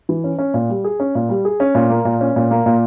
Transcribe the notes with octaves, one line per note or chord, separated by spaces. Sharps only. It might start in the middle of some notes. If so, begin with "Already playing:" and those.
E3
C#4
C#4
A#2
G3
G#4
C#4
A#2
G3
G#4
C#4
A#2
A#3
A#2
C#4
A#2
A#3
A#2